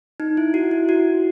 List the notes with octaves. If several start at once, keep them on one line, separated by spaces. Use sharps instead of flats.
D#4
E4
F#4
E4
F#4